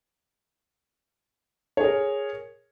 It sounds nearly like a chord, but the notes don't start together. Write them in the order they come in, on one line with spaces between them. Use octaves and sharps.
C#5 G#4 A#4